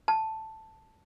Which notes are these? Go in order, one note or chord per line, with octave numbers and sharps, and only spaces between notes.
A5